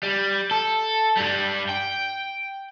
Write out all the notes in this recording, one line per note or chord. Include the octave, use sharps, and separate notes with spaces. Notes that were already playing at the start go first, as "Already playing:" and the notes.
G3
A4
G2 G3
G5